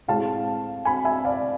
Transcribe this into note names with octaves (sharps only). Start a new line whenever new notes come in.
A2 G#3 C4 F5 A5
G#5 B5
E5 G#5
D5 F5